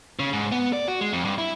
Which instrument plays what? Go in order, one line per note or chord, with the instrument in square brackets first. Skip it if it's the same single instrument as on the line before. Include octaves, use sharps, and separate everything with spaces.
[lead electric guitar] C#3
G#2
B3
D5
F#4
G#3
F2
G2
E4